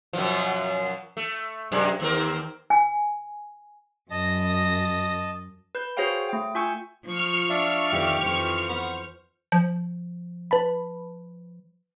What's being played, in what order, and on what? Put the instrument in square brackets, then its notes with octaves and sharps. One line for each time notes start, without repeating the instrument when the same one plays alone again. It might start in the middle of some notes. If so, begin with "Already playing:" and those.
[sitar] F#2 B2 F3
A3
F#2 C3 G#3
D#2 C4 A#4
[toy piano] G#5
[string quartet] F#2 A#6 [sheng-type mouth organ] D#5 A5
[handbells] B4 G6
F#4 G#4 C5 C#5 F5 G5
A3 G5
F4 G#5 C#6 E6 G6 C#7
[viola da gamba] F3 F4 [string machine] C#6 F6
[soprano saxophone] D4 [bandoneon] D5 E5 F5
[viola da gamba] F2 D#3 E3 [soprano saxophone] G4
[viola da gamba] F2 E3 F3 [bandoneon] C5
[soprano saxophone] B3
[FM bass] F3
[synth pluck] B4 A5 B5